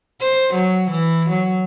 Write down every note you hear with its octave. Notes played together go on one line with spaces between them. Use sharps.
C5
F#3
E3
F#3